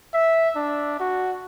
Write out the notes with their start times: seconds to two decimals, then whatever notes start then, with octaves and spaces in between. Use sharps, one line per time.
0.14 E5
0.56 D4
1.00 F#4